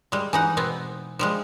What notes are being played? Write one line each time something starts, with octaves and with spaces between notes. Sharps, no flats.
G3 G#3
E3 D#4 F#5 G#5
B2 B3 C4
F3 G3 G#3